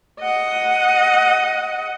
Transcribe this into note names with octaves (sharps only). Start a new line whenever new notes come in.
D#5 F#5